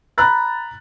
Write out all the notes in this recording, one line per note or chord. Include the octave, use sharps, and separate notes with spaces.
A#5 B5 F#6 A6